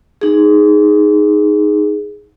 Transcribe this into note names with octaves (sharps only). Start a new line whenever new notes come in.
D#4 G#4